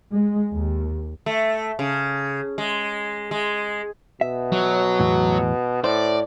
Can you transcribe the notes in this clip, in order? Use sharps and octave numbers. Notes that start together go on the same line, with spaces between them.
G#3
D#2
A3
C#3
G#3
G#3
B2 E5
F#3
E2 A2
A2 C5 D5